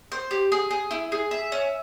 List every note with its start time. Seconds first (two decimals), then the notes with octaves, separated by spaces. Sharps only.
0.12 C5
0.31 G4
0.52 G#4
0.71 G#4
0.91 E4
1.12 G#4
1.31 E5
1.52 C#4